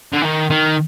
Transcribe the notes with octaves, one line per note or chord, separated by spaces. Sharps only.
D3
D#3
D#3